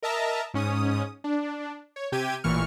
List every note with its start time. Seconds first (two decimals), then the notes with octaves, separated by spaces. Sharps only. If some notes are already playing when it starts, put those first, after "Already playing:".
0.03 A#4 D#5 E5 A5 A#5
0.54 G#2 C#4 D#6
1.24 D4
1.96 C#5
2.12 C3 G4 G5 G#6 D#7
2.44 A1 A#2 E3 C#6 F6